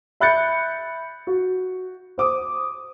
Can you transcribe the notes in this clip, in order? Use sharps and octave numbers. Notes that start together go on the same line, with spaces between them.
E5 B5 F#6 G6 A6 C#7
F#4
C5 D6 D#6